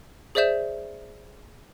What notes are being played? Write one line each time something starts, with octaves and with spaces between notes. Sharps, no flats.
G#4 C5 D5 E5 G6 E7